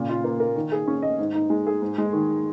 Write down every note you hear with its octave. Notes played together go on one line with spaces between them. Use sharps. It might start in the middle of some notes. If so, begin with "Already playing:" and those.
Already playing: A#2 C#3
F4
A#3
A#4
D#3
G#4
C#4
D#5
G#2
D#4
G#3
G#4
G#2
G#3
D#3